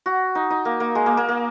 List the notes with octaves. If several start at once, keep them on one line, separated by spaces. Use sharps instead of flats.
F#4
D#4
D#4
A#3
A#3
G#3
A#3
A#3
A#3